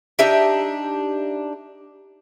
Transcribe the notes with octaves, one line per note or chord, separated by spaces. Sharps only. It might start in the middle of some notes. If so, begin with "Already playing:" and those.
D4 D#4 G4 E5